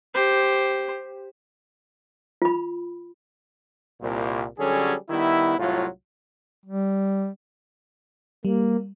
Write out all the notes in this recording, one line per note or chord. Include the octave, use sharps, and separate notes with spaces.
G4 C5
F4 B5
C2 A#2
D3 F#3 G3 C#4 G#4 A4
D#3 G3 B3 E4
C2 A2 F#3 F4
G3
G3 A#3